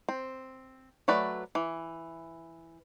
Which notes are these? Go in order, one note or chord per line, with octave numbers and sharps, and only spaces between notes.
C4
F#3 A3 B4 D5
E3